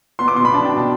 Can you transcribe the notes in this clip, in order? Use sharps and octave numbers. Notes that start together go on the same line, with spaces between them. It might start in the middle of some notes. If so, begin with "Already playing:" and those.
B3 C6
D6
B2 C6
B5
D4 A5
G5
B2
A5